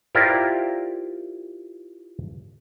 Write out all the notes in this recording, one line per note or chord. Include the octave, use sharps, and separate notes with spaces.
E4 F4 G4 A#4 C5 D5